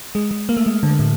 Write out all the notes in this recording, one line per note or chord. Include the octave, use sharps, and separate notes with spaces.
G#3
G#3
A#3
A3
G#3
D3
A2